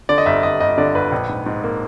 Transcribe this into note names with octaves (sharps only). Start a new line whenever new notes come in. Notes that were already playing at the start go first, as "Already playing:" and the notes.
D3 D5
D#5
G1 E5
G1 D#5
G1 D#5
D3 D5
G1 B4
A#1
G#2
G#2
A#3